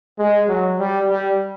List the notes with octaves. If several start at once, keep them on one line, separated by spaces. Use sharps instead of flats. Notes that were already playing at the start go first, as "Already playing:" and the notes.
G#3
F#3
G3
G3